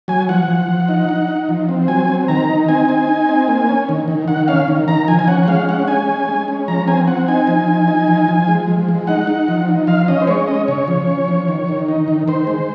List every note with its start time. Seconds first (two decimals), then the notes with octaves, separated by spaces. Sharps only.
0.08 F#3 G#5
0.29 F3 F#5
0.48 F3
0.68 F3
0.88 D#4
1.09 D#4
1.28 D#4
1.49 F3
1.69 C4
1.88 F#3 G#5
2.08 C4
2.28 D#3 A#5
2.49 D#4
2.68 C4 G#5
2.89 D#4
3.09 D#4
3.29 C4
3.48 A#3
3.69 C#4
3.89 D#3
4.08 D#3
4.28 D#3 F#5
4.48 C#4 F5
4.68 D#3
4.88 D#3 A#5
5.08 F3 G#5
5.19 G#5
5.28 C#4 F#5
5.43 F#5
5.48 G#3 F5
5.69 C#4 F#5
5.88 C#4 G#5
6.09 G#3
6.29 G#3
6.48 C#4
6.68 F3 A#5
6.87 C4 G#5
7.07 C4 F#5
7.28 D#4 G#5
7.47 F3
7.67 D#4
7.88 D#4
8.07 F3
8.28 F3
8.48 G#3
8.68 F3
8.89 G#3
9.07 D#4 F#5
9.27 D#4
9.48 F3
9.69 D#4
9.87 F3 F5
10.08 C#4 D#5
10.22 C5
10.27 G#3 C#5
10.48 C#4 D#5
10.68 C#3 C#5
10.88 F3
11.07 C#4
11.28 F3
11.48 D#3
11.68 D#3
11.88 D#4
12.08 D#3
12.28 D#3 C5
12.47 G#3